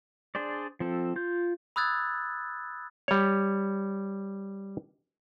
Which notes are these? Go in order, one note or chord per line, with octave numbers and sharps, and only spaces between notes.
D4 G#4 C5 D5
F3 C4 A4
F4 G6
B5 D#6 E6 F#6 G#6 A6
G3 C#5